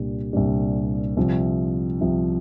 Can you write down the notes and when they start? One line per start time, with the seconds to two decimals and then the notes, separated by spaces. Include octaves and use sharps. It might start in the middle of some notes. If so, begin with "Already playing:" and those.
Already playing: C2 A#2 G3 D4 G4
0.33 C2 A#2 G3 D4 G4
1.17 C2 C3 F3
2.01 C2 C3 F3